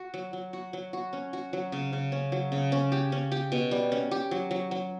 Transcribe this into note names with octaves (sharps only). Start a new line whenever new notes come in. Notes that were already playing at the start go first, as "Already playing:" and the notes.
Already playing: F#4
F#3
F#3
F#4
F#3
F#4
C#4
F#4
F#3
C#3
C#3
C#4
F#3
C#3
C#4
G4
C#4
G4
B2
G3
C#4
G4
F#3
F#3
F#3